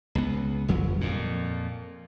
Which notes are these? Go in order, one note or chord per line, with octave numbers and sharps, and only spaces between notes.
C#2 B3
G1 F2 F#3
F2 A#2